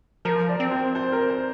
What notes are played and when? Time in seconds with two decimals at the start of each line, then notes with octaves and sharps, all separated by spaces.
0.25 F3 A#4
0.49 D5
0.60 C4
0.71 C5
0.95 C5
1.12 A#4
1.30 C5